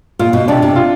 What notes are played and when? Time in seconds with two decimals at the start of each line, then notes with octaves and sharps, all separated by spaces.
0.19 A#2 F4
0.33 B2
0.48 C3 D4
0.62 C3
0.76 F4